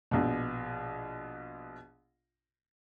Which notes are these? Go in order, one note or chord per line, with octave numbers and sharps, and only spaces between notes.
A#1 B2